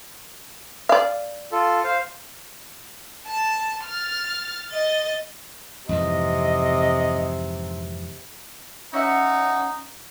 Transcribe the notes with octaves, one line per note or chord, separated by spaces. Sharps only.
D5 F5
F4 A4
C5 F5
A5
F6 A6
D#5 A6
F2 G#2 C3 E3 D#5
C#4 D#4 F#4 E5 F#5